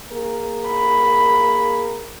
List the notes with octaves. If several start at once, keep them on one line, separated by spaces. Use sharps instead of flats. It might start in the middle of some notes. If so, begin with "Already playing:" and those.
A#3 G#4 A#4
B5